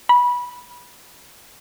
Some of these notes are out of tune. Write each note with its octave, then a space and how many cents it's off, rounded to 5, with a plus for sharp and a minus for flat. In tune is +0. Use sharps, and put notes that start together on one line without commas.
B5 -20